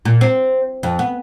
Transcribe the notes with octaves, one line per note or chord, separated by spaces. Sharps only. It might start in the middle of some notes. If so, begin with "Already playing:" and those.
A#2
C4
F2
B3